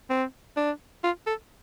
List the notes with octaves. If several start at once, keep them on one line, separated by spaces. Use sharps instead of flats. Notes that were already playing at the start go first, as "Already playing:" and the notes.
C4
D4
F4
A4